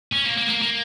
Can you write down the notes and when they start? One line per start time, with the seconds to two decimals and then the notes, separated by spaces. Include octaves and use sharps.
0.13 C#4
0.25 A#3
0.38 A#3
0.49 A#3
0.62 A#3